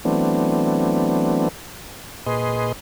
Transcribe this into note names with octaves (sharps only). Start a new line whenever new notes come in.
E3 F#3 A3 B3 C4 D4
A#2 G#4 B4 D#5 C6